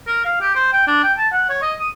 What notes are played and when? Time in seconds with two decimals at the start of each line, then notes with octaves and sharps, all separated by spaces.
0.07 A#4
0.25 F5
0.41 G4
0.55 C5
0.73 G5
0.87 D4
1.04 G5
1.18 A5
1.33 F#5
1.50 C#5
1.63 D#5
1.80 D#6